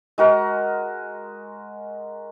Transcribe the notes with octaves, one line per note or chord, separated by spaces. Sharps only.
G#3 F#4 A#4